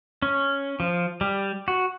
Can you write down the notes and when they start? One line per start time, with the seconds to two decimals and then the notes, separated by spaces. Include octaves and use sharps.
0.22 C#4
0.80 F3
1.21 G3
1.68 F#4